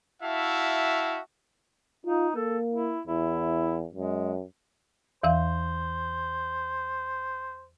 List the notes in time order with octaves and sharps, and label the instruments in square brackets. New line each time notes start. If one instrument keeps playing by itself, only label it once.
[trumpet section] E4 F#4 E5 F5 A5
[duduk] D#4 [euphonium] F4
[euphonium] A#3 [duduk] A4
[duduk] E4
[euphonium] E2 [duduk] E4
[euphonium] F#2 [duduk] G#3
[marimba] E2 E3 F5 [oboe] C5